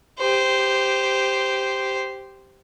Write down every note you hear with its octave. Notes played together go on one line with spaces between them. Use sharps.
G4 C5